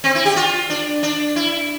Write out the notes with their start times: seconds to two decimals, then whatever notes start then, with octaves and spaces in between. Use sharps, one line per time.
0.04 C4
0.15 E4
0.25 G4
0.36 F4
0.70 D4
1.03 D4
1.36 E4